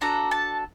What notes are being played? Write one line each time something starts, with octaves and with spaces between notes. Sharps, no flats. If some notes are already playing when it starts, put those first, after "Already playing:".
D4 F#4 A4 A#5
A5